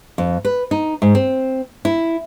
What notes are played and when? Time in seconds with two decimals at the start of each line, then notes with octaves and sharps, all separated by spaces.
0.18 F2
0.45 B4
0.71 D#4
1.02 G#2
1.15 C4
1.85 E4